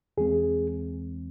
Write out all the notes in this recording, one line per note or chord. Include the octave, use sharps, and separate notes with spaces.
E2 E3 G#3 C4 G#4